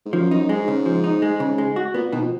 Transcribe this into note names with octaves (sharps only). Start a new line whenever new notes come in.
G#2
F#2 F3
F#2 D#4
G#2 G#3
C#3
F3
D#4
G#3
C#3
G#3
F#4
A#2 B3
B2 D#3
F3